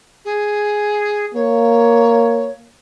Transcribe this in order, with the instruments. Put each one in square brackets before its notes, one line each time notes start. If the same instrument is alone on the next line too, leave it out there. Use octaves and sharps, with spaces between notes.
[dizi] G#4
[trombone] A#3 [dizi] C#5